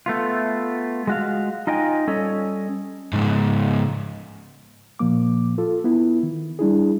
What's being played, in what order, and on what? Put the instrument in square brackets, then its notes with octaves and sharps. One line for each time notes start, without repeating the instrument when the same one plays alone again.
[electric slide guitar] A3 B3 F4
G#3 F#4 F5
D#4 F4 D#5 G5 G#5
G3 C#4 A4 C#5 D#5
[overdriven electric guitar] C#2 G#2
[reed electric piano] A#2 F3 A#3 D6
F4 A4
B3 E4
D#3
G3 D4 E4 G#4